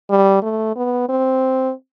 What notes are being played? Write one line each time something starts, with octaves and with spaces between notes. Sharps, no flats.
G3
A3
B3
C4